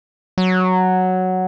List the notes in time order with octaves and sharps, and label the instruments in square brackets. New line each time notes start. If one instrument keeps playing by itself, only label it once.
[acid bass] F#3